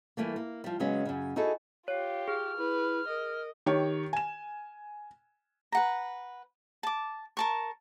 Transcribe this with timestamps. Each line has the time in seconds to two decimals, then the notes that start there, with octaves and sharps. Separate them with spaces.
0.17 E3 G3 A3 A#3
0.36 A#3
0.64 F3 G3
0.80 C#3 F#3 G#3 B3 C#4
1.05 F#2 C#3
1.36 D#4 E4 F#4 G#4 A4
1.88 F4 G4 C#5 F5
2.28 G#4 F6
2.57 E4 B4
3.08 A#4 D#5
3.66 D#3 G4 C#5
4.13 G#5 E7
5.72 B4 F#5 A#5
6.83 A5 D6
7.37 A#4 A5 C#6